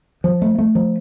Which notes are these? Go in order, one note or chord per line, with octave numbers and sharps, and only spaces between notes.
F3
A3
A3
F3